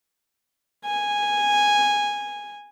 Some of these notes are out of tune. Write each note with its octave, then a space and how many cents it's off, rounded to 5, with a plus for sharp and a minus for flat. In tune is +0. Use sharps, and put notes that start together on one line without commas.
G#5 -10